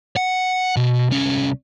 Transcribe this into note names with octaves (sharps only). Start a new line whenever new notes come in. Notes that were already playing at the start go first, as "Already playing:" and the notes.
F#5
B2
C2 C#4